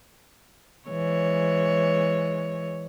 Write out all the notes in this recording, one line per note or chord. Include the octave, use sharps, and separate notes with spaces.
E3 G#3 C#5